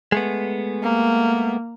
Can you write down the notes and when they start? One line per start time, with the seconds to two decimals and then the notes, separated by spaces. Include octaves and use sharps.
0.12 G#3 A3 B3
0.82 A#3